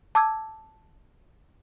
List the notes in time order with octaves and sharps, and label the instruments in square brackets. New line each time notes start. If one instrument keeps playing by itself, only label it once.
[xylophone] A5 D6 E6 G#6